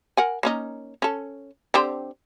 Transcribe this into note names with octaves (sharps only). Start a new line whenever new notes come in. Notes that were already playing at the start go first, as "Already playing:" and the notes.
A#4 F#5 G#5
A#3 C#4 D#4
C#4 A4
D3 C4 G4